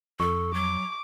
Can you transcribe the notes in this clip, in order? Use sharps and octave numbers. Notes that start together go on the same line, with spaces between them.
F2 A4 C#6
F#3 D6